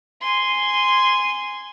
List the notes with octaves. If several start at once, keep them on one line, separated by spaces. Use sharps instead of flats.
G#5 C6